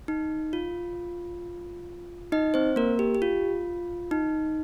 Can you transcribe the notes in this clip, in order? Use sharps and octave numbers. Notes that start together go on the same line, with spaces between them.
D#4
F4
D#4 D#5
C4 C5
A#3 A#4
G4
G4
F4
D#4